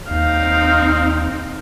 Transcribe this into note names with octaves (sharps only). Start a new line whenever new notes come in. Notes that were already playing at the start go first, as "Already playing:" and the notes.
D#2 C4 D#4 F5